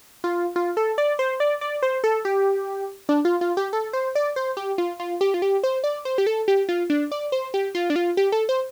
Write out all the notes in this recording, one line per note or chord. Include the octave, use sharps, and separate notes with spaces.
F4
F4
A4
D5
C5
D5
D5
C5
A4
G4
D4
F4
F4
G4
A4
C5
D5
C5
G4
F4
F4
G4
F4
G4
C5
D5
C5
G4
A4
G4
F4
D4
D5
C5
G4
F4
D4
F4
G4
A4
C5